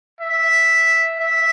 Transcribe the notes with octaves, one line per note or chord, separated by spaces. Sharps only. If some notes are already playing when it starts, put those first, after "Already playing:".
E5
E5